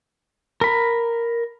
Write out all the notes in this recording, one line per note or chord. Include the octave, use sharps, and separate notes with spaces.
A#4 B5